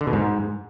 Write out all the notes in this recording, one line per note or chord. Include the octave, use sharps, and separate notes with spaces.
D3
B2
G#2